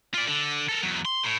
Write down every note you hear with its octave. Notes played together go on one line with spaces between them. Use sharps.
F4 D5
D3
A4 A#4
E2 F#3
C6
A2